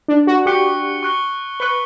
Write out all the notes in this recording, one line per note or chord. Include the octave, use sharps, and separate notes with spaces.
D4
F#4
G4 C#6 F#6 C#7 G7
C#6 F#6 C#7 G7
B4 C#6 F#6 C#7 G7